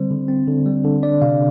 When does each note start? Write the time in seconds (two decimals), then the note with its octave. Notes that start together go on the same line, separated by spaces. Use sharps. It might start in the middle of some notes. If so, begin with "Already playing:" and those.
Already playing: D3 G3 C4 C5
0.11 D3
0.28 C4
0.47 D3
0.66 G3
0.84 D3
1.03 D4 D5
1.22 C3 F5